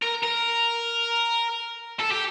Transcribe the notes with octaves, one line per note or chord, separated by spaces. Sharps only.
A#4
A#4
A4
G4